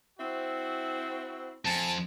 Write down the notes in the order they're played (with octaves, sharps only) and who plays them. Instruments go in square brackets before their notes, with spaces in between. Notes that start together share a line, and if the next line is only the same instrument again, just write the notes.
[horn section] C4 E4 F#4
[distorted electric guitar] F2 [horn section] G#5 A5